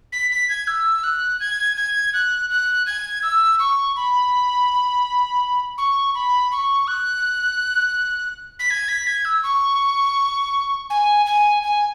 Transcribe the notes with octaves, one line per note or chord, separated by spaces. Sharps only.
B6
B6
G#6
E6
F#6
G#6
G#6
F#6
F#6
G#6
E6
C#6
B5
C#6
B5
C#6
F#6
B6
G#6
B6
G#6
E6
C#6
G#5
G#5
G#5